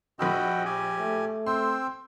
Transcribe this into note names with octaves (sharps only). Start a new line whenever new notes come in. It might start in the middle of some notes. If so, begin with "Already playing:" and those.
A#1 F#4 D#5 G5 B5 E6
G4 G#5
A3
C4 G5 C6 E6